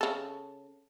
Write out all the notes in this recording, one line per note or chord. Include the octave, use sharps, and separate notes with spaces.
C#3 A4